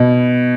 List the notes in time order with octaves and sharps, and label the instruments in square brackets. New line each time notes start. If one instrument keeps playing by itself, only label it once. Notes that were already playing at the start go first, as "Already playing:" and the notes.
Already playing: [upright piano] B2